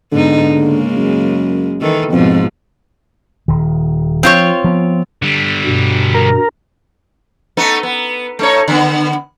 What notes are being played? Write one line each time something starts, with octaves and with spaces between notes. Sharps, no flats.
G#2 D3 B3 D#4
C#3 G#3 A#3
F#2
D#3 E3 A4
F2 G#2 B2 F3
D#1 D#3
F3 C4 F4 C#5
F3 B3
D3 G3
G2 B2
A#4
A3 B3 D#4
B3
A3 D#4 C#5
D3 B3